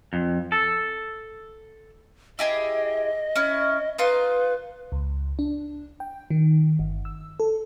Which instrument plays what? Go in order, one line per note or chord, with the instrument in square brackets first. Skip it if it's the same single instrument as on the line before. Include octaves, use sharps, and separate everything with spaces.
[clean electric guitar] F2
A4
[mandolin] E4 G4 G#4 [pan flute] D#5
[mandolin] C#4 E4
[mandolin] D#4 F4 C6 [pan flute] B4
[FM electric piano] C#2
D4
G5
D#3
G1
E6
A4